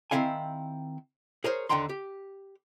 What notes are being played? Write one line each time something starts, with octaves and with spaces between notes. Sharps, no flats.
D#3 F#3 C4 E4 F5 G#5
G#4 A#4 C5 C#5
D#2 D3 F#5 G5 A#5 C6
G4